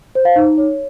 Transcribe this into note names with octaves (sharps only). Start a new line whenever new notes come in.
C5
F5
D#4
C#5